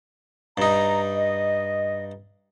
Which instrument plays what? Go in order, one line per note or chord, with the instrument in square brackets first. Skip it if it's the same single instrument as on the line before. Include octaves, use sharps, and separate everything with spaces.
[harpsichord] G2 D#4 [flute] A#5
[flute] D#5